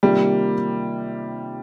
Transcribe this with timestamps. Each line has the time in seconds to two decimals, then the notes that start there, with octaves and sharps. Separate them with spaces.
0.03 C3 D#3 G3 A#3 F4